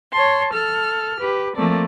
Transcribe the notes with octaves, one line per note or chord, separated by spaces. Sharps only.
C#5 A5 C6
A4 F6
G4 B4
F3 A3 A#3 C4 A4 D5